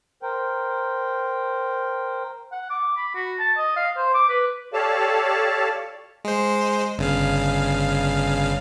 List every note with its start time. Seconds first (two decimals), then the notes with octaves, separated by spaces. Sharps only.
0.23 A#4 C5 G5
2.52 F#5
2.70 D6
2.97 B5
3.15 F#4
3.40 A5
3.57 D#5
3.76 F5
3.97 C5
4.14 D6
4.30 B4
4.73 G4 A4 C#5 D5 F5 A5
6.25 G#3 C5
6.98 G1 C#3 F5